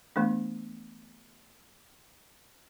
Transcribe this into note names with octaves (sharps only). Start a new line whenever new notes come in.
E3 A3 B3 D4